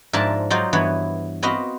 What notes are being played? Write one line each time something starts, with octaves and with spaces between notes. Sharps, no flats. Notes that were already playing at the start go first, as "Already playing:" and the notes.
G#2 F3 D4 A#4 E5 A5
F#3 D#4 F4 C5 D5
G2 E3 B3 C#5
B3 C4 F#4 B4 D#5 F5